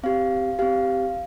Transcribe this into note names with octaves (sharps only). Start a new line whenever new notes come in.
C4 G4 F5
C4 G4 F5